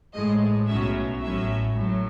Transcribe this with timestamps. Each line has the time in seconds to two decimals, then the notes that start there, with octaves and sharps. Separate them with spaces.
0.14 A1 A2 G#3 D#5
0.68 B1 A2 F#3 C#4 E5
1.22 A1 A2 F#3 C#4 E5
1.76 A2 F#3